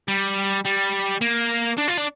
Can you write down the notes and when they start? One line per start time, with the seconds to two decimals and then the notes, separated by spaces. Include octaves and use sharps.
0.08 G3
0.65 G3
1.21 A#3
1.78 D4
1.88 F4
1.98 D4